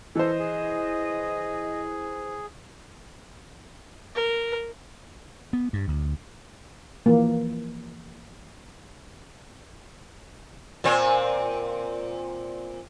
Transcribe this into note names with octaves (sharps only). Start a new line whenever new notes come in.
E3 A4 C5 D#5
G#4
A#4
B3
G2
D2
E3 F3 A#3
A#2 C4